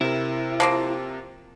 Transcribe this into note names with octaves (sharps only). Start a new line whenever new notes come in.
C3 E4 A#4
F3 A#3 C4